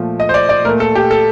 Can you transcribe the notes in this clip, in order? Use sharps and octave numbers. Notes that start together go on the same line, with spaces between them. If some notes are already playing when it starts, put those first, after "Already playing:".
Already playing: A#2 F3 A3
D#5
C5
D5
D5
A#2 A3 A#4
A4
G4
A4